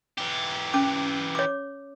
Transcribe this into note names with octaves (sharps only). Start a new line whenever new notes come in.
E3 G4
C#4 D6
C#5 D6